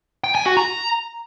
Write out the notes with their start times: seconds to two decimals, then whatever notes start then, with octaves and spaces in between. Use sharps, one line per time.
0.24 G5
0.35 G#5
0.46 F#4
0.57 A#5